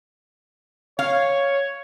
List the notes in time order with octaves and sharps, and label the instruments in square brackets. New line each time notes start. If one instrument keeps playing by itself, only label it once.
[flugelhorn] C#5 [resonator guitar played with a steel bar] F5